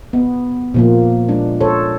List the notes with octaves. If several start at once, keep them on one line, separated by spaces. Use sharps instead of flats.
B3
A#2 F3 A#3
G#3 D4
A4 C5 C#5